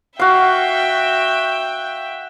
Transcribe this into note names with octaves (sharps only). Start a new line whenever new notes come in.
F#4 E5 F5 G5